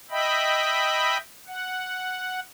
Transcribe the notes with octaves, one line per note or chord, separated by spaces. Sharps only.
D#5 E5 G5 B5
F#5